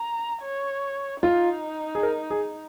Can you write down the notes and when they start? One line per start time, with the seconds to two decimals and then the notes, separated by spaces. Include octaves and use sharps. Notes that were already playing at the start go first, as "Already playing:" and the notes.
Already playing: A#5
0.42 C#5
1.23 D#4 F4
1.95 G#4
2.03 A#4
2.30 G#4